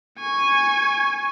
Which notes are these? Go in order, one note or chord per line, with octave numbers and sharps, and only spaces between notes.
G#5 C#6